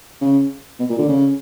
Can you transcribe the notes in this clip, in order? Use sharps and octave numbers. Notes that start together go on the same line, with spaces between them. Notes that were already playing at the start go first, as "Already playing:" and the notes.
C#3
B2
A#2
D3
C#3